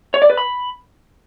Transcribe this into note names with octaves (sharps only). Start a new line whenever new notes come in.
C#5
D5
B4
B5